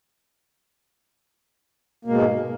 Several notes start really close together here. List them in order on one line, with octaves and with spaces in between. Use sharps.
A#3 B2 G#3 G#2